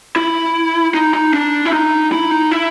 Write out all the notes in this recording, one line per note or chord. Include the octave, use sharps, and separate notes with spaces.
E4
D#4
D#4
D4
E4
D#4
E4
D#4
E4